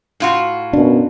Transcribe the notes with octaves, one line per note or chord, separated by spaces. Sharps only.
A2 F4 F#4
F#2 B2 D4